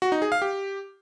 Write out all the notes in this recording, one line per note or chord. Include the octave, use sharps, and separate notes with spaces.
F#4
D#4
G#4
F5
G4